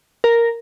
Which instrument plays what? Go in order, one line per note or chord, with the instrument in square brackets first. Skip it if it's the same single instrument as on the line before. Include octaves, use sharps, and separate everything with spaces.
[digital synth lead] A#4